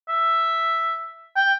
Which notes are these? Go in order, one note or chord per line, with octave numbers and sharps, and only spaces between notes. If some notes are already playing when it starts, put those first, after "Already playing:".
E5
G5